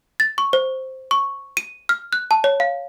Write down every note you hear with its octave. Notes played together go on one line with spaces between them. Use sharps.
A6
C#6
C5
C#6
D#7
F6
F#6
A5
C#5
F5